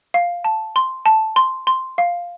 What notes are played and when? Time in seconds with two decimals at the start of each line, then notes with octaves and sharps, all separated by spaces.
0.14 F5
0.44 A5
0.76 C6
1.06 A5
1.36 C6
1.67 C6
1.98 F5